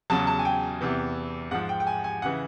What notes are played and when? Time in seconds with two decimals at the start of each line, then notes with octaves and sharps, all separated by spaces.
0.10 E2 C#3 F#3 A5
0.27 A5
0.39 G#5
0.45 G5
0.81 E2 C3 E3
1.51 G#2 F3 F#5
1.69 G5
1.80 G5
1.87 G#5
2.04 G#5
2.22 C#3 E3 F#5